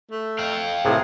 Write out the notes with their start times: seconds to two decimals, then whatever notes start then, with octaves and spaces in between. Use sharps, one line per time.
0.11 A3
0.38 F5 G5
0.85 A2 C3 G#4 A#4